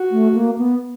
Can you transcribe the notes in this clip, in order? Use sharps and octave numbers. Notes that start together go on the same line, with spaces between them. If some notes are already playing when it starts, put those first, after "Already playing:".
Already playing: F#4
A3
A#3
B3